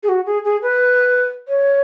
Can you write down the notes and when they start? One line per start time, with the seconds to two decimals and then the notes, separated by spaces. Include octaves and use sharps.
0.03 G#4
0.09 F#4
0.26 G#4
0.44 G#4
0.62 B4
1.48 C#5